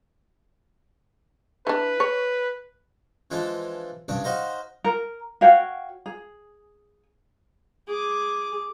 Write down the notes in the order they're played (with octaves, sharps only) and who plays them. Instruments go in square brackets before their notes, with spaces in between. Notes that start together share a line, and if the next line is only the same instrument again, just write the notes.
[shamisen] E3 D4 [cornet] B4
[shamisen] C#5
[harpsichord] E3 F3 G#3 D4 A4
C2 G2 C#3 D4 D5
D#4 F#4 C5 D#5 F5 A#5
[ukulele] A#4
F#4 C#5 F5 G5
G#4
[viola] G#4 D6